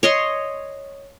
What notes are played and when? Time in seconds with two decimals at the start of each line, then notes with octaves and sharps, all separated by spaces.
0.03 C#5 D#5 C6